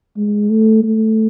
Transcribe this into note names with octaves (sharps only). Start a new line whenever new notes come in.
G#3
A3
A3